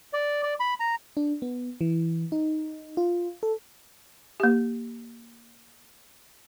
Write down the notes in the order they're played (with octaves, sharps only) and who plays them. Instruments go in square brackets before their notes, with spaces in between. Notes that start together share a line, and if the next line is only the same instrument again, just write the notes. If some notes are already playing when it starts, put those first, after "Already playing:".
[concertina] D5
D5
B5
A#5
[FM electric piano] D4
B3
E3
D#4
F4
A4
[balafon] A#3 G4